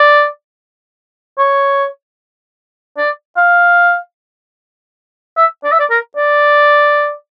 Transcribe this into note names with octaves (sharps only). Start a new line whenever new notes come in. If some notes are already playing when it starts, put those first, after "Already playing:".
Already playing: D5
C#5
D5
F5
E5
D5
E5
D5
A#4
D5